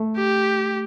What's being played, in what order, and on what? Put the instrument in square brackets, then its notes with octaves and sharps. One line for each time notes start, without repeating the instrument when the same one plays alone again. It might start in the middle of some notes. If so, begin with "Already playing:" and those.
Already playing: [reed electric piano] A3
[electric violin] G4